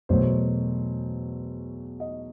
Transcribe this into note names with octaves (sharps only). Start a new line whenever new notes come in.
E2 B2 F#3 A3 C5
D#5